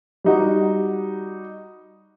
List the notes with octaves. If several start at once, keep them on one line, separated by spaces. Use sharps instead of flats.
G3 D#4 F#4